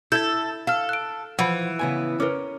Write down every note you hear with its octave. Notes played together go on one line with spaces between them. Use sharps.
E4 A4 G6 G#6
A4 F5 F6
F#6 D7
E3 F3 F#5 B5
C#3 B3 G#5
C#4 A#4 B4 D6